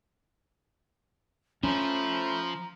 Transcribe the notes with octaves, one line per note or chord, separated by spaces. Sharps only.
F3 A3 C#4 C5 A#5 B5